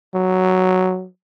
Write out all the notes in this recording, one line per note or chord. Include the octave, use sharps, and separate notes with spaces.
F#3